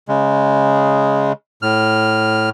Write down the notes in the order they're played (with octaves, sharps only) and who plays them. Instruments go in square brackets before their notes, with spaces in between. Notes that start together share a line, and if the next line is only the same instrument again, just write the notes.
[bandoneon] C#3 G#3
A2 F6